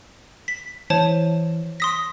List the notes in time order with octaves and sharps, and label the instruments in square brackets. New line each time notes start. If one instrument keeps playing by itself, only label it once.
[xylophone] B6
[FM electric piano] E3 [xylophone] C5 C#5 A5
[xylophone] C6 D#6 A#6 [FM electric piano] B6